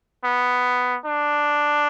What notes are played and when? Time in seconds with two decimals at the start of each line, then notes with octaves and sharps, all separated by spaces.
0.24 B3
1.06 D4